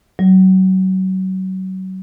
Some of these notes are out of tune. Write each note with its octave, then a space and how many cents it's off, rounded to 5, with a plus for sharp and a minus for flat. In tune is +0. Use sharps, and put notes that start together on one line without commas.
F#3 +30